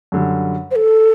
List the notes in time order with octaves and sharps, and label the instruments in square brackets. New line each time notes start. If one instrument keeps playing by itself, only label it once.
[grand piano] F#2 D3 G3
[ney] C5
A4